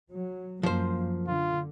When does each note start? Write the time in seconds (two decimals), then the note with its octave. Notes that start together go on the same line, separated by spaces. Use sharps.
0.13 F#3
0.63 F#2 F3 A#3 C5
1.27 D3 F4